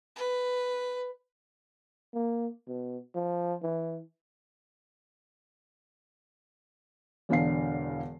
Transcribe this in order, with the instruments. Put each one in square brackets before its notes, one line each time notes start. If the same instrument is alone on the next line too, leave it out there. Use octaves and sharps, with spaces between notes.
[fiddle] B4
[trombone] A#3
B2
F3
E3
[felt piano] E1 E2 D3 F5 C7